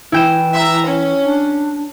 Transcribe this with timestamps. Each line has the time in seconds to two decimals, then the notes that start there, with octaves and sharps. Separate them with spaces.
0.12 E3 E4 G5 E7
0.55 E5 A#5
0.87 C#4
1.23 D4